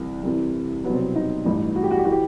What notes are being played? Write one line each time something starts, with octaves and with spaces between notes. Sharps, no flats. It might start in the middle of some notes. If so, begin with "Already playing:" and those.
Already playing: C2 C3 E3
C2 C3 E3
C2 B2 F#3 B3
C4
B3
D#4
A1 G2 E3
F#4
G4
F#4
G4
E3 F#4
G4